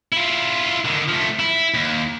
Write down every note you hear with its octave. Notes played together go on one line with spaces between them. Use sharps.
E4 F4
D3 D#3
F3 A3
E4
D#2